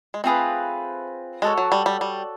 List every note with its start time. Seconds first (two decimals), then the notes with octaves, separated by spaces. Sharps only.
0.14 G#3
0.24 A3 C4 F4 G#4 B4
1.42 G#3 F#4 A4 C#5
1.58 F#3
1.72 G3
1.86 G3
2.01 G3